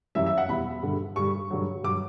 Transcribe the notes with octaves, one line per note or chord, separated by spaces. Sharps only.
F#2 E3 G3 E5
E5
F#5
E2 B2 G3 B5
G2 D3 G3
G2 D3 G3 C#6
G2 D3 F#3
G2 F#3 D6